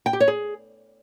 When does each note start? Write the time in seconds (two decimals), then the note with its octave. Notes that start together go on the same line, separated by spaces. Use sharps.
0.06 G5
0.13 G4
0.20 C#5
0.28 G#4